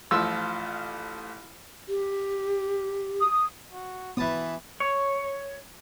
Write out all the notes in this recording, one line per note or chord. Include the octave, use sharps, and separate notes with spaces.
A1 F3 F4 E6
G4
D#6
F#4
E3 B3 A5 B5 D#6
C#5